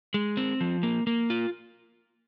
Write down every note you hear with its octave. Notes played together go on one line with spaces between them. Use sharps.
G#3
C4
F3
A#3
A#3
F4